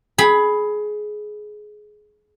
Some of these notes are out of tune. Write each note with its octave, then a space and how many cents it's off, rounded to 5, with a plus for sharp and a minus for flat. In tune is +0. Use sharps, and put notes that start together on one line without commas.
G#4 +20 B5 +0